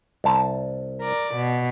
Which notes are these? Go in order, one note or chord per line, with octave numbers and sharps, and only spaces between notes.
C2 A5
A#4 D5
B2